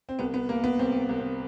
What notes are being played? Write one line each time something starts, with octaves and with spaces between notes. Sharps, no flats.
C4
C2 B3
B3
C2 A#3
B3
C2 C4
C2
C4